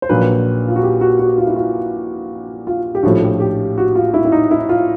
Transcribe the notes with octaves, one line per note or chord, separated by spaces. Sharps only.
C5
A#1 A#2 F#3 B4
F4
F#4
G4
F#4
F#4
F4
E4
F4
F4
G4
A#1 A2 F3 A3 F#4
G4
G4
F#4
F4
E4
E4
D#4
E4
F4